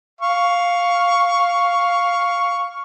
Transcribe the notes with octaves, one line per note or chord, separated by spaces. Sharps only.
F5 C#6